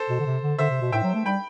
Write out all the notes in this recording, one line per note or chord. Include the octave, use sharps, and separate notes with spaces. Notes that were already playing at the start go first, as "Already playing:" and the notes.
Already playing: A4 C5
B2
D3
C3
D3
D3 C5 E5
C3
B2
A2 E5 G5
F#3
A3
G3 G5 B5